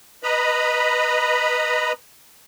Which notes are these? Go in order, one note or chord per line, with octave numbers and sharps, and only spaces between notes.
B4 D#5 A#5 B5